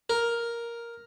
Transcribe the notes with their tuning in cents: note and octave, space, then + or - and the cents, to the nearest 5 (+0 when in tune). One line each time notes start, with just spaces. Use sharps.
A#4 +5